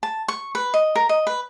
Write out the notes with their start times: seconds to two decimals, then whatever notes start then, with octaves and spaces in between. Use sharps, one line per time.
0.03 A5
0.28 C#6
0.55 B4
0.74 D#5
0.96 A#4
1.09 D#5
1.27 B4